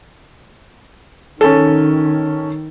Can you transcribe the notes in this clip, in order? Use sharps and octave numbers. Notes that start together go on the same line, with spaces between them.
D#3 C#4 A4